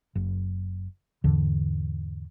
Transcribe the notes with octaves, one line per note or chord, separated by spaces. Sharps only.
F#1
E2 G#2 D3 E3